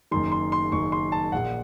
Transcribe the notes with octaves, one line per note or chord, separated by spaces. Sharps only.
F#1 F#2 D#3 C6
C6
C6
F#1 F#2 D#3 C#6
C6
A5
A#1 A#2 F#5